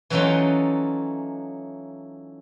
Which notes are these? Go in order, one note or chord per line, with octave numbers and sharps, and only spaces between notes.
E3 F#3 A3 C#4 D#4 F4